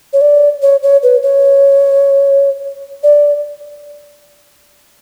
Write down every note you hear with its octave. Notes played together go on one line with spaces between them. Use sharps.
C#5
D5
C#5
C#5
B4
C#5
D5